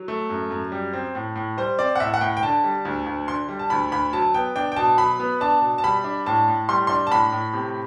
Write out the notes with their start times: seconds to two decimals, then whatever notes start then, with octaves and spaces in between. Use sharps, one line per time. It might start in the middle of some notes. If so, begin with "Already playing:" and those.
Already playing: F#3
0.08 A3
0.30 F#2
0.51 F#2
0.72 G3
0.93 C4
1.15 A2
1.36 A2
1.57 G3 C5
1.79 C4 D5
1.96 F#5
2.00 A2 E5
2.14 F#5
2.21 A2 G5
2.37 G5
2.43 D3 A5
2.64 G3
2.85 D2
3.06 D2
3.28 D3 C6
3.49 G3
3.59 A5
3.70 D2 B5
3.92 D2 B5
4.13 F#3 A5
4.34 B3 G5
4.56 D4 G5
4.72 G5
4.76 B2 A5
4.98 F#3 B5
5.20 B3
5.41 D4 A5
5.62 B2
5.78 A5
5.84 G3 B5
6.04 D4
6.26 A2 A5
6.48 A2
6.69 G3 C6
6.87 D4 C6
7.07 A5
7.11 A2 B5
7.32 A2
7.54 C3